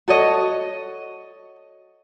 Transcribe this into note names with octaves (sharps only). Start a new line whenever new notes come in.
F#4 A4 C#5 D#5